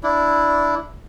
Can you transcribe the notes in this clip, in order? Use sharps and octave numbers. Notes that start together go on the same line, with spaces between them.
D4 E4